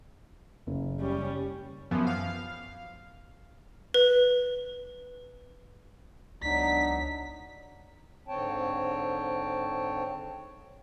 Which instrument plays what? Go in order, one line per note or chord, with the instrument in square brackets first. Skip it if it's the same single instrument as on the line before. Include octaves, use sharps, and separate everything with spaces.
[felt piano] F#1
[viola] G3 C#4
[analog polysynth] F#2 E3 F3 B3
F5
[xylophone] B4
[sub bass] C#2 [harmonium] F#3 B3 D#4 [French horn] D4 [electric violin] B6
[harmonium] G#2 D3 C4 C#5 G5 A5